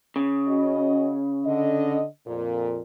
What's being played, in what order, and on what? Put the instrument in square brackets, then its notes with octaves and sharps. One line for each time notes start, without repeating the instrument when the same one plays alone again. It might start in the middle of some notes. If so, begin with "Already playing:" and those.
[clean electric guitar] C#3
[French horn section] C#4 F#4 D#5
D3 D#5
F2 A#2